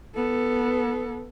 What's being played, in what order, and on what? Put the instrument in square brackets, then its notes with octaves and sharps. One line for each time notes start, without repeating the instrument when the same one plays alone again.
[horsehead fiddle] B3 A4